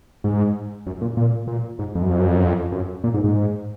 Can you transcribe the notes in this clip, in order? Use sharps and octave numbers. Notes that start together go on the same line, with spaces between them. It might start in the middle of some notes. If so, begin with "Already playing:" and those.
G#2
F#2
A#2
A#2
A#2
G#2
F2
F#2
F2
F#2
F2
F#2
F2
F#2
A#2
G#2
G#2